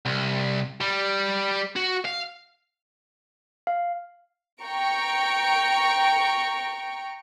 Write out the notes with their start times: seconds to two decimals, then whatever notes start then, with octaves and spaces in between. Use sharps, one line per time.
0.06 C2
0.81 G3
1.76 F#4
2.05 F5
3.67 F5
4.61 G5 A#5 C#6 D7